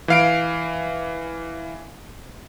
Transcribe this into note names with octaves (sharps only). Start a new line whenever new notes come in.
E3 F5 D7